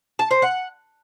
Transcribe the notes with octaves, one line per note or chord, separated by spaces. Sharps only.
A5
C5
F#5